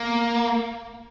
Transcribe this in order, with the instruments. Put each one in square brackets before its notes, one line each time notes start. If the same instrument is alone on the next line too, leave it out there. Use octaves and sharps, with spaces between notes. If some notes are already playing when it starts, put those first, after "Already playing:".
Already playing: [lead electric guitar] A#3